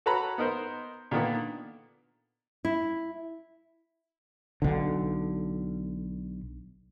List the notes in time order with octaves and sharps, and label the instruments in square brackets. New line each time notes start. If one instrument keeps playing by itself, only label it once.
[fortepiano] F#4 A4 B4 C#5 A#5 B5
B3 D#4 A#4 C5
A#2 D3 D#3 A#3 B3
[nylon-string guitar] E4
[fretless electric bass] B1 D3